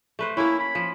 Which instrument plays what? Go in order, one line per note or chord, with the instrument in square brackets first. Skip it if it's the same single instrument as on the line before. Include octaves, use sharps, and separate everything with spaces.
[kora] A3 B4 C5
[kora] A#3 C#4 [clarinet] E4
[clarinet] B5
[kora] F3